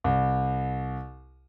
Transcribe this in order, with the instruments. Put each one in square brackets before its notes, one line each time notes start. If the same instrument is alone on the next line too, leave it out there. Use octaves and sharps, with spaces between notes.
[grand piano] C2